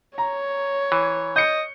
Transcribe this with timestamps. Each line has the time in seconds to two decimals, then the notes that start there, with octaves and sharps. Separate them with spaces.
0.18 C#5 A#5
0.92 E3
1.36 D#5 G6 C#7